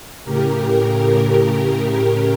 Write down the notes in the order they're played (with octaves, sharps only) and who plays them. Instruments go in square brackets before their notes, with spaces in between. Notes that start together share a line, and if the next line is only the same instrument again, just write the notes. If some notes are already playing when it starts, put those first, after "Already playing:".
[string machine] A2 C#3 G4 A#4